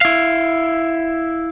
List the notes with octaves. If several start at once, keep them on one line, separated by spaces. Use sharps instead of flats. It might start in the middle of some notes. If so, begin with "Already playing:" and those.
E4 F5